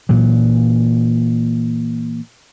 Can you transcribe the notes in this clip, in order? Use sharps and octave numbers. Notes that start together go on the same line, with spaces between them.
A#2 E3 F#3